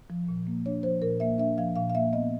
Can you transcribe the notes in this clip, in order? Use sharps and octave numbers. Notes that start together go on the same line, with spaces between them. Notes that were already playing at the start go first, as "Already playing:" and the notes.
F3
A#2
A#3
D4 C#5
F3 C5
A#2 A#4
A#3 E5
D4 E5
F3 F5
A#2 F5
F5
A#3 E5
B3 D#5